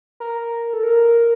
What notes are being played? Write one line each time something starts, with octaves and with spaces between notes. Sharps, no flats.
A#4
A4
A#4